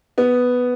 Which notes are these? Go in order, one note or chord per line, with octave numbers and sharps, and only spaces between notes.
B3